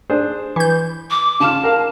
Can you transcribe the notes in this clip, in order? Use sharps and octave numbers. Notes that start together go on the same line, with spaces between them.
D4 G#4 C5
E3 G6
D6
C#3 F4 A5 F6
A#4 F5